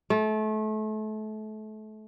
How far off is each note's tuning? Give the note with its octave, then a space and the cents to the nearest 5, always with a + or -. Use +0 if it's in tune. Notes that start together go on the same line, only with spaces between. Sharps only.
A3 -30